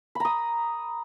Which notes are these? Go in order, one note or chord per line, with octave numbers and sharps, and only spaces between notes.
A#5 B5 D#6